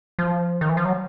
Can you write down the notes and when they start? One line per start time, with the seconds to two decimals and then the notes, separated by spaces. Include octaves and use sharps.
0.19 F3
0.61 D#3
0.69 E3
0.77 F3
0.85 F#3